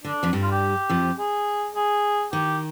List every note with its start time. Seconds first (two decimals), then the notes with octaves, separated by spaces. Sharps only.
0.04 D3 D4
0.23 F2 F3
0.33 G2 G3
0.43 F4
0.52 G4
0.89 F2 F3
1.18 G#4
1.75 G#4
2.32 D#3 G4